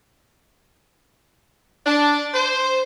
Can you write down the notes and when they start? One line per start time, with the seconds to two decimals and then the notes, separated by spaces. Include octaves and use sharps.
1.86 D4
2.34 C5